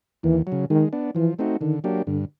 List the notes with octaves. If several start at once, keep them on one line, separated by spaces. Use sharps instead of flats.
D#2 E3
F#3
C#3
D#3 G#3
B3 D4
E3 F3
A3 C4 D#4 F#4
D3 D#3
F#3 A#3 D4 G4
G2 D3